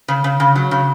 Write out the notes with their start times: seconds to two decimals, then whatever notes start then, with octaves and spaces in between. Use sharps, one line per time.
0.08 C#3
0.24 C#3
0.40 C#3
0.55 F#3
0.71 C#3